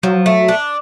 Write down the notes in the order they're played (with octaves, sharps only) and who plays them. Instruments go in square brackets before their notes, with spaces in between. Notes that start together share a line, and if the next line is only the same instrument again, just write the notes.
[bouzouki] F3 [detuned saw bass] F#3
[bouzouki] A3
D4